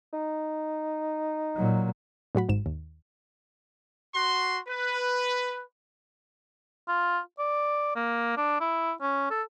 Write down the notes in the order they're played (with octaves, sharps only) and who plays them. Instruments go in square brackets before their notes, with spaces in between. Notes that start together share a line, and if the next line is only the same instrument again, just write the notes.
[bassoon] D#4
[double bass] A#2 F#3
[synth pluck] A2 F#3 F#4 B5
G#1 G#2 E7
D#2
[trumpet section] F#4 C6
B4
[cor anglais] F4
D5
A#3
D4
E4
C#4
A4